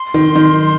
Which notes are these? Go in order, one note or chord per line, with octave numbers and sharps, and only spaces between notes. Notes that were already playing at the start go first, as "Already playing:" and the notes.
Already playing: C6
D#3
D#3